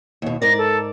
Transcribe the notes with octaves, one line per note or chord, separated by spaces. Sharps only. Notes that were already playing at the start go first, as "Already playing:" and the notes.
D#2 B2
G#2 A#4 D5 A#6
A4